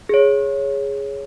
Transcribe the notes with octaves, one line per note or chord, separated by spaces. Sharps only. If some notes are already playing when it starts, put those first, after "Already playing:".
G#4 C#5